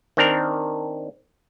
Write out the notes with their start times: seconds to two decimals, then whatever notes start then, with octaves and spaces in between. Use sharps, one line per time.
0.17 D#3 C4 D4 A#4